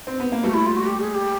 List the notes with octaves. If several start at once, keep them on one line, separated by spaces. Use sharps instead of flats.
C4
B3
A#3
G3 A3 F#4
E4
F4
F#4
G4
G#4
G4